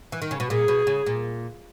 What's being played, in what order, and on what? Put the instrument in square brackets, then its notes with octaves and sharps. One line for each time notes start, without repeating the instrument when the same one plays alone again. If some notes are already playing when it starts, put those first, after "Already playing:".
[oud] E3
D#3
C#3
B2
[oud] A#2 [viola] G#4
[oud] B2
C#3
A#2